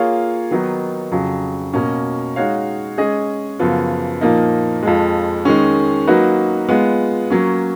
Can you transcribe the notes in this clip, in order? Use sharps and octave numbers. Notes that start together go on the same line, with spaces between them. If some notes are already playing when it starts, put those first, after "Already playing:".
Already playing: A#3 F4 G#4 C#5 F5
D#3 F#3 B3 D#4
F2 C#3 F#3
B2 A#3 C#4
G#3 D#4 F#4 C#5 F5
G#3 C#4 G#4 D#5
F#2 C#3 F3 B3
A#2 F3 A#3 D#4
F2 F3 G#3
D#3 G#3 C#4
F#3 A#3 D#4 F#4 B4
G#3 B3 F4
F#3 A#3 C#4